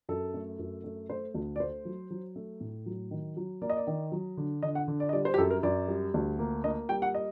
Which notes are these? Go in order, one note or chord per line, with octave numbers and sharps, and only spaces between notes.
F#2 A4
A3
F#2
A3
A3 C5
D2
D5
A3 C5
F#3
F#3
A3
A2
F#3
D#3
F#3
A#3 D5
D#5
D5
D#3
F#3
D3
D3 D#5
F#5
D3
D5
D#5
G3 D5
C5
G4
F#2 A4
A#4
F#2 D5
G3
D2
A#3
A#3 D#5
G3 G5
F#5
D#5